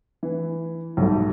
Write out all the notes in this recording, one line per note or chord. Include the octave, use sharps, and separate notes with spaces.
E3
B1 G#2 G3 A3